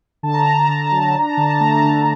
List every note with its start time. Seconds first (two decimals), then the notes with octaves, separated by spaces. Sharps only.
0.23 D3 A5
0.34 A#5
0.44 D3 A5
0.54 A#5
0.65 D3 A5
0.77 A#5
0.87 F#3 A5
0.97 A#5
1.08 A5
1.15 D4 A#5
1.29 A5
1.37 D3 A#5
1.50 A5
1.60 A3 A#5
1.71 A5
1.83 D3